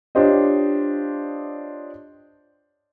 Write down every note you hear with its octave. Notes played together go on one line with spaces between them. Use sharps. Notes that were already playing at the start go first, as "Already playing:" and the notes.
D4 F4 G4 C5 C#5 D#5